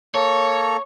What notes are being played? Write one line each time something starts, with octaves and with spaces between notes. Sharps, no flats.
A#3 A4 C#5 A#5